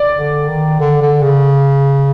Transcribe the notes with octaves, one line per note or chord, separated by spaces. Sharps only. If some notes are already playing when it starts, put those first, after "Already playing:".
Already playing: D5
D3
D#3
D3
D3
C#3